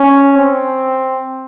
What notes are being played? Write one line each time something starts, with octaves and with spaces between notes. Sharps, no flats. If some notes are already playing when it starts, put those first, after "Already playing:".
Already playing: C#4
C4